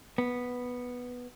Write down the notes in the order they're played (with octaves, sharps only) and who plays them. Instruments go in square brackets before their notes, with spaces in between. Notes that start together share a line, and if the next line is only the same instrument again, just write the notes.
[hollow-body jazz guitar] B3